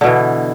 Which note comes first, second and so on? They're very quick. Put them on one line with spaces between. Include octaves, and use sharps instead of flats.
D3 B2 E3